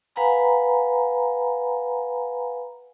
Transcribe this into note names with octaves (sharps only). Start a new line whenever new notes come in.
B4 F5 F#5 G#5 A#5 B5